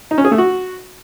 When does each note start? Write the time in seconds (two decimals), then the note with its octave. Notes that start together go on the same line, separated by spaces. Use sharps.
0.11 D#4
0.18 C#4
0.25 G#4
0.31 A3
0.38 F#4